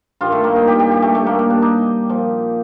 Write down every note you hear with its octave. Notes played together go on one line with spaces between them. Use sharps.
G2 D#3 G3 F4
A3
A#3
D#4
G4
G4
G4
A3
A3
A#3
A#3
D4
D#4
A#2 F3